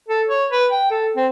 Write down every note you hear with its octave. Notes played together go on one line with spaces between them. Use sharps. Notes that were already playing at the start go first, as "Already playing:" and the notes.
A4
C#5
B4
G5
A4
C4